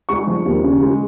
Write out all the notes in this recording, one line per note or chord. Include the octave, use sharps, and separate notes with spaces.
G#3 C#6
F3
D#2
C#3
G#3